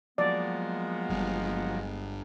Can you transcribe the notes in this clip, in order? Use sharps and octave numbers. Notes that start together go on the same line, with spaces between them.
F3 F#3 G#3 A#3 B3 D5
G1 G2